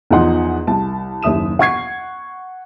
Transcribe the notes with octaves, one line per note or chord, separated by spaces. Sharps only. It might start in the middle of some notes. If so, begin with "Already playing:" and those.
E2 F3 D#4 F#5 C6
C2 A5
F#1 D#2 E5 D#6 E7
F#5 C#6 G#6 C7